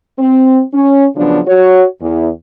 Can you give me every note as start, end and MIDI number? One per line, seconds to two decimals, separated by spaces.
0.18 0.61 60
0.74 1.06 61
1.16 1.40 49
1.16 1.40 53
1.16 1.40 54
1.16 1.40 59
1.16 1.40 62
1.47 1.85 66
1.47 1.85 73
2.00 2.28 40